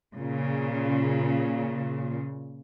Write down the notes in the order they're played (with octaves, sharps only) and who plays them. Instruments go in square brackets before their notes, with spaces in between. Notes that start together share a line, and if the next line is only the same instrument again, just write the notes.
[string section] A#2 C#3